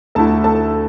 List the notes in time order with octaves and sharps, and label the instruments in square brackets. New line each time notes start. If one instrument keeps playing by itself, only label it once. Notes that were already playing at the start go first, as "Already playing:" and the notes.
[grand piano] D2 D3 A3 E4 [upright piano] A4 A5
[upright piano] A4 A5